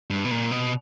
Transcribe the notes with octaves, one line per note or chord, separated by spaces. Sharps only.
G2
B2
A#2
B2